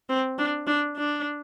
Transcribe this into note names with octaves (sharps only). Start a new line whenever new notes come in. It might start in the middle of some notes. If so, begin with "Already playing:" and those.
C4
D4
D4
D4